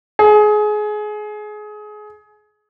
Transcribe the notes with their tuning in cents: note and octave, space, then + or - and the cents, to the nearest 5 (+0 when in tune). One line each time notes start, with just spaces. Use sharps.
G#4 +25